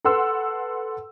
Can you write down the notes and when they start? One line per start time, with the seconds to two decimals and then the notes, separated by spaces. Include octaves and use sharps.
0.05 A4 B4 F#5 C6 E6